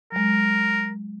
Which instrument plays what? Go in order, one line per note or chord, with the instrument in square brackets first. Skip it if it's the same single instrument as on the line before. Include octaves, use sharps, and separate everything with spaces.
[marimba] F#3 G#3 [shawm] A#4